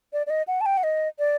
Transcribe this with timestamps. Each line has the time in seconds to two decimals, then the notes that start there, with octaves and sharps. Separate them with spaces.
0.13 D5
0.27 D5
0.30 D#5
0.48 F#5
0.61 A5
0.66 G5
0.77 F#5
0.83 D#5
1.19 D5